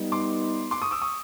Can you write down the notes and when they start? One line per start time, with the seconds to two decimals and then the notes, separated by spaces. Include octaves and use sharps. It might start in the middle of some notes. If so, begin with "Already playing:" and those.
Already playing: G3 B3 D#4
0.12 C6 D6
0.71 C6 D6
0.82 C#6 D#6
0.91 D6 E6
1.01 C#6 D#6